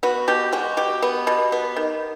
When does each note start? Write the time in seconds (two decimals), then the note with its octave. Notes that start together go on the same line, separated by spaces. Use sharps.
0.03 B3 F#4
0.28 B2 G4
0.53 G#3 F#4
0.77 B2 G4
1.02 B3
1.27 B2
1.52 B3
1.76 D#3